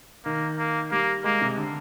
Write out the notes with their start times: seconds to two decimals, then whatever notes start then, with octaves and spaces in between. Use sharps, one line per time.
0.25 D#3 A#3
0.58 A#3
0.92 G3 A#3
1.24 G#3 A#3
1.41 C3
1.57 D3